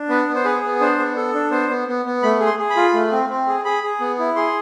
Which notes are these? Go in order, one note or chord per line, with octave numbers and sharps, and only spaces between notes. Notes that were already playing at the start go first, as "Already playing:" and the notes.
Already playing: D4
B3 B4
B3
C5
G#4 B4
B3
D4 C5
B3
A4
D4
B3 C5
B3
B3
B3
A3 B5
G#4
C6
G#4
B5
F4
A3
C4
C4
G#4
G#4 B5
G#4
B3
E4
G#4 C6